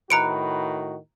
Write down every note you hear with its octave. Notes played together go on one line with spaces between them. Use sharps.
A2 D#3 F#4 B4 A#5 C#7 D7